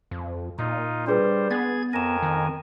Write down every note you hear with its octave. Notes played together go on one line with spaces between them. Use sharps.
F2
A#2 D#4 F4
G3 D4 G#4 B4 C5
B3 G#4 G#6 A6
F2 A#4 G#5 A#6 E7
D#3